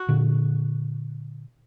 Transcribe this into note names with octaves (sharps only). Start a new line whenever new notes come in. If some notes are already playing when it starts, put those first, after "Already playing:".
Already playing: F#4
A#2 D3